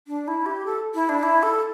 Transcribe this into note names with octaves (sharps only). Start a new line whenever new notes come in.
D4
E4
G4
A4
E4
D4
E4
A4